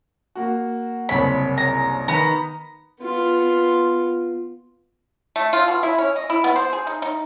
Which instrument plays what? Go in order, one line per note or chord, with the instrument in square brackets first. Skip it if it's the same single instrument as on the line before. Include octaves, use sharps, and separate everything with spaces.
[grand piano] A#3 F#4
[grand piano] F#1 C2 C#5 [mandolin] B5
[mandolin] A#5
[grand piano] D#3 [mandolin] B3 A#5
[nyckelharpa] B3 F4
[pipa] A3
F4
B2
E4
C#4
D#5
E4
B3
C5
G#4
D#4
D#4